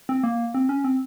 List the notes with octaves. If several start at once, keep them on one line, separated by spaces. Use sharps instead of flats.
C4
A#3
C4
C#4
C4